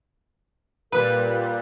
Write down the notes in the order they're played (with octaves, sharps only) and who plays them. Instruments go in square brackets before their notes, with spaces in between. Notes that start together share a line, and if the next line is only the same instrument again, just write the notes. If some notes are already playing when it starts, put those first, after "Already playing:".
[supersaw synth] A#2 G3 [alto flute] A#4 [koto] B4